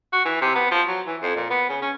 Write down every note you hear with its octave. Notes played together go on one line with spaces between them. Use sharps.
F#4
E3
C3
B3
F3
F#3
E3
F2
A#2
B3
C#3
C#4